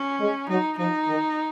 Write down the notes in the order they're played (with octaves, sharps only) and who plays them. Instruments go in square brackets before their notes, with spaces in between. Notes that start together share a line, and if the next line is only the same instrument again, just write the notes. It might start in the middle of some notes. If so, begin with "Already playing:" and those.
Already playing: [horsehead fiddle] C#4
[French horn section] G#3
[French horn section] F#3 [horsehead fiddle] D#4
[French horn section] F3 [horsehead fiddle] D#4
[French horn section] D#3